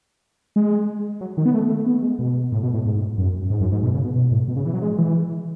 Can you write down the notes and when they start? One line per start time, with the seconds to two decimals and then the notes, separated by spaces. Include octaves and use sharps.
0.56 G#3
1.21 F#3
1.37 D#3
1.46 B3
1.54 A3
1.70 A3
1.86 B3
2.02 G#3
2.19 B2
2.52 A2
2.63 B2
2.74 A2
2.85 G#2
3.18 F#2
3.50 G#2
3.61 F#2
3.72 G#2
3.83 B2
3.94 C#3
4.04 B2
4.16 B2
4.32 A2
4.48 B2
4.56 C#3
4.65 E3
4.73 F#3
4.82 G#3
4.98 E3